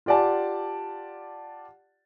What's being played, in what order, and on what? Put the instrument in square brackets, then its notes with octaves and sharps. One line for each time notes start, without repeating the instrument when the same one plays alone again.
[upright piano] F4 G4 D5 F#5 A5